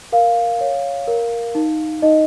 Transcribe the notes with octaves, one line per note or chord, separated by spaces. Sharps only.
A#4 F5
C#5
A#4
D#4
D#4 D#5